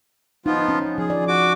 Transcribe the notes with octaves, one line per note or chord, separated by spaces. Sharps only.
F3 B3 D#4 F4
C#4
F3 G#4
D5
F#4 D6